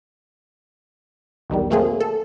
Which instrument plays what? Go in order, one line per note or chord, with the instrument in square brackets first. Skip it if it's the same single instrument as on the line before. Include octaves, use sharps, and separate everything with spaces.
[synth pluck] B1 E2 D#3 G3
F#3 A3 A#3 C4 G#4
A4